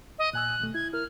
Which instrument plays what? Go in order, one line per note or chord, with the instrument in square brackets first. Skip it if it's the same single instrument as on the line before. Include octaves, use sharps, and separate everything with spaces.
[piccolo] D#5
[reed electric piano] A#2 G#5 E6 [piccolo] F#6
[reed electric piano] D#2 B2 A3
[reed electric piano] E4 [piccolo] G#6
[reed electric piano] E4 A#4 [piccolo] F6